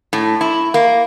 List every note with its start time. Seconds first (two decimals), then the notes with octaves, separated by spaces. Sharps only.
0.13 A2
0.41 E4
0.74 A#3